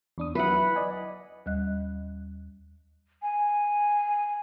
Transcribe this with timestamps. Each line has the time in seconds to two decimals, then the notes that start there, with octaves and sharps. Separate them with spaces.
0.18 E2 D4 D#6
0.35 F#3 E4 B4 E5 F#5
0.76 D5 D#5 G#5
1.46 D#2 G3 D#5 F#6
3.22 G#5